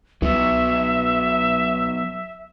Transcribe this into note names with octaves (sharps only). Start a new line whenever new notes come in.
C2 F#3 B3 E5